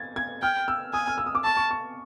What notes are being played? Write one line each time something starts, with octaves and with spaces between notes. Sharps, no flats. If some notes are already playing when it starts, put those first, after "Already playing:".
Already playing: G#6 A6
G#6
G5 F6
E6
G#5 D#6
F6
E6
D#6
D6
A5 C#6
C#6
C#6